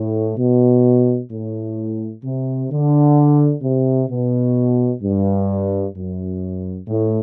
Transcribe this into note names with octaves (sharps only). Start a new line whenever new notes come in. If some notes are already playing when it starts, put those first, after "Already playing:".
Already playing: A2
B2
A2
C3
D3
C3
B2
G2
F#2
A2